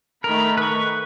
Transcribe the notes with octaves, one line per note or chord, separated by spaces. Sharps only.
D#3 A3 A#4 B5
B4 C#6